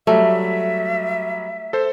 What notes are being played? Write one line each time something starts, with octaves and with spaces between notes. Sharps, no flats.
F#3 G3 A3 E5
A4 C5